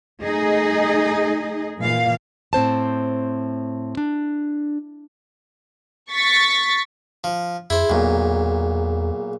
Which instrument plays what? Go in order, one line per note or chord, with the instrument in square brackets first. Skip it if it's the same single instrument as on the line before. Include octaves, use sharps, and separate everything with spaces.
[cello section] A3 D#4 G#4 D#5
A#2 E3 F5
[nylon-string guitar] A2 C4 C5 A5
D4
[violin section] C#6 A6 B6
[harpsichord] F3
[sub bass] F2 [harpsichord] E4 C5 [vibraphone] G#4
[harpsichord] B1 A#2 [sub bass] E2